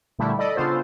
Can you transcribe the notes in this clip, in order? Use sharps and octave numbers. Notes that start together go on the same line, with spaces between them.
A#2 D3 G3 A3 E4
A4 D5 D#5 B5
C#3 B3 D4 F4 A4 C5